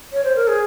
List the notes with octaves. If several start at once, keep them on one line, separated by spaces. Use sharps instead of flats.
C#5
C5
A#4
G#4